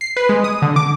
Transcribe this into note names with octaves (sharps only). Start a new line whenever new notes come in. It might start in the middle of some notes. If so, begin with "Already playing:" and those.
C7
B4
G#3
D#6
D3
D6